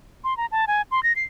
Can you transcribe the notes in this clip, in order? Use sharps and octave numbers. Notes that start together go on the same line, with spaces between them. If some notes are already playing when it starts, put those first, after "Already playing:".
C6
A#5
A5
G#5
C6
A#6
C7